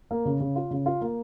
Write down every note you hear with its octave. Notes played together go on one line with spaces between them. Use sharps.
A#3
C#3
C#3
F4
C#3
F4
A#3